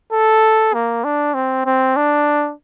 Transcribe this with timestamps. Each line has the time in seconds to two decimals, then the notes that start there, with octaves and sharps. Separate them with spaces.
0.12 A4
0.74 A#3
1.04 D4
1.34 C4
1.65 C4
1.96 D4